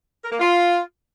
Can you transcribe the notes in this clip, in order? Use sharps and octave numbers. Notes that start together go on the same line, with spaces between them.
A#4
A#3
F4